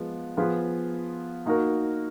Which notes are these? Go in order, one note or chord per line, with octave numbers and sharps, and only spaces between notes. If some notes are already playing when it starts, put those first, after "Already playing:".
Already playing: F3 G#3 B3
F3 B3 F4 G#4 B4
A#3 D#4 F#4 A#4